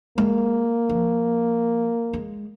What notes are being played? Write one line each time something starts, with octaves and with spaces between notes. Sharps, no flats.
G#3 A#3
F3
G#3